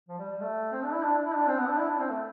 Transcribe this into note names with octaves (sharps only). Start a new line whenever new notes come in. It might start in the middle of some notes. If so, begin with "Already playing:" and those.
F3
G3
G3
A3
C4
D4
E4
D4
E4
D4
C4
B3
D4
E4
D4
C4
A3